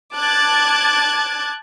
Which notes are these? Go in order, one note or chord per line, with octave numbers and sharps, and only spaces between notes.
A5 D6 F#6 G#6 A6